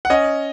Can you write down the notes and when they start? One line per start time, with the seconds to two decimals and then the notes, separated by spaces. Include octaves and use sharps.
0.05 F#5
0.10 C#4 D#5